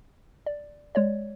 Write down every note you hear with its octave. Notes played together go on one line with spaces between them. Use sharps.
D5
G#3 C#5 D5